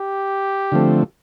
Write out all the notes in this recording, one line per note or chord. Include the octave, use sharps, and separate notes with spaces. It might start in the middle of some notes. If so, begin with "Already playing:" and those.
Already playing: G4
D3 F3 A3 C4